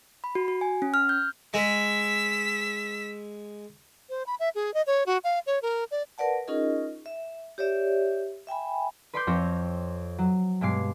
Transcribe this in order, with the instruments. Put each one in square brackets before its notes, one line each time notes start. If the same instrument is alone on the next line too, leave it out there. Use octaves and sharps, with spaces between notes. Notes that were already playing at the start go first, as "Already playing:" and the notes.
[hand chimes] B5
F#4
F#4
G#5
C#4
F6
G6
[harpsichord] G#3 [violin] E6 B6
[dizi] C5
B5
E5
G#4
D#5
C#5
F#4
F5
C#5
A#4
D5
[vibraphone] A#4 B4 D5 F#5 A5
C#4 D#4 F4 G#4 A#4 D#5
E5
G4 C#5 D5 E5
E5 G5 G#5 B5
[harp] B4 D5 B5 C6 D6 G6
F2 C4 C#5 A#6
F#3
G2 B2 G#3 D6 C7